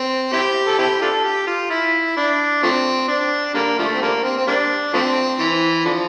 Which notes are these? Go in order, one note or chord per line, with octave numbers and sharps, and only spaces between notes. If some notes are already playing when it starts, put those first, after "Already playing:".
Already playing: C4
C4 E4 G4
A4
C4 E4 G4
D4 F4 A4
G4
F4
E4
D4
F3 A3 C4
D4
D3 G3 A#3
D3 F3 A3
C4
D3 G3 A#3
C4
C4
G3 A#3 D4
F3 A3 C4
E3
D3 F3